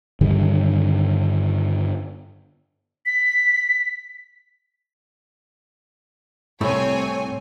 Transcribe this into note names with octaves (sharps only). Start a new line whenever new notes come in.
G2 D3 D#3 G3
B6
C2 A2 A3 C4 E4 C#5 G#5